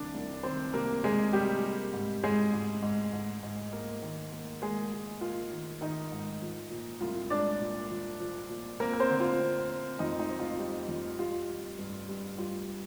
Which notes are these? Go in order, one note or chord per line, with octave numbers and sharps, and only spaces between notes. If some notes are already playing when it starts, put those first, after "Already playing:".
Already playing: C2 C3 D#3 D4 D5
C2
D#3 C4 C5
C3 A#3 A#4
C3 G#3 G#4
C3 G3 G4
A#3
G#2
G#2 G#3 G#4
G#2
G#2
G#2
G#2
A#3
D#3
A#3
G#3 A#3 G#4
A#3
A#3 F4
D#3
D#3 D#4
G#2
F3
A#2
C2 F4
G#3 D4 D5
A#2
F3
F3
A#2
A#3 C4 A#4
A#4
C4 C5
D3
F4
C4
C4
F2 D#4
D#4
C4
F4
G3
F2
G3 F4
G3
G2
G2
G3 F4